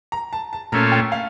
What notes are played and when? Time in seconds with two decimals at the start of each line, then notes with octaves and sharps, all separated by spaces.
0.12 A#5
0.33 A5
0.53 A5
0.72 A#2 A3 C#4 F4 A#5
0.92 G5
1.12 F5